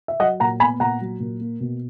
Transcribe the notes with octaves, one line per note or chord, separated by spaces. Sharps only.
E5
F#3 D#5 F#5
A#2 F#5 A#5
B3 G#5 B5
A#2 F#5 A#5
F#3
A#2
A#3
B2